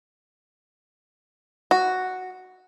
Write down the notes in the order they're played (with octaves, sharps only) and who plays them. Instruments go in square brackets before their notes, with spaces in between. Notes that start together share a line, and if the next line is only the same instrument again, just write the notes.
[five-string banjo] F#4